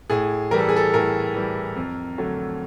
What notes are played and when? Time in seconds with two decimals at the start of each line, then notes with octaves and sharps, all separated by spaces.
0.10 A2 G#4
0.51 E3 G3 A#4
0.60 A4
0.69 G#4
0.76 A4
0.94 A2 A#4
1.34 E3 G3
1.76 F2
2.18 D3 F#3 A3